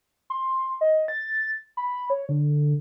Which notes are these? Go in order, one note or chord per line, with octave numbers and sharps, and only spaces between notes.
C6
D#5
A6
B5
C#5
D3